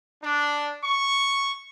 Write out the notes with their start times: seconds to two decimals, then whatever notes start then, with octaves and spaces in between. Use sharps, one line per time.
0.23 D4
0.83 C#6